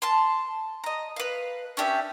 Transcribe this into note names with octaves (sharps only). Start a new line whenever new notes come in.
A5 C6
D#5 A#5
B4 F5
C#4 D4 G4 E5